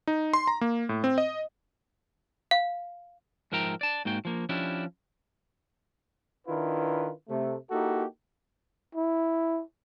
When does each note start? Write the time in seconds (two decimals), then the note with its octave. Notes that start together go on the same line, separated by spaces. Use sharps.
0.07 D#4
0.34 C6
0.47 A#5
0.61 A#3
0.89 A2
1.04 C4
1.18 D#5
2.51 F5
3.52 G#2 F3 A#4 E5 G5 A#5
3.81 D5 A5
4.05 G#2 A#3 F#4 G5
4.25 F3 A#3
4.49 F3 C#4 D4 E4 G4
6.47 D#3 D4 E4 F4 B4
7.29 C3 A3
7.71 A#3 D#4 E4 F#4 G4 A4
8.95 E4